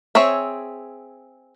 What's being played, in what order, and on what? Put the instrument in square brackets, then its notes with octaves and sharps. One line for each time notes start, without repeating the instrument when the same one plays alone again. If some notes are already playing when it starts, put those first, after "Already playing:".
[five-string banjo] C4 G#4 C#5 E5